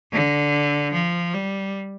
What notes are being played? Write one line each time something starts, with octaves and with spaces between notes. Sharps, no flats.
D3
F3
G3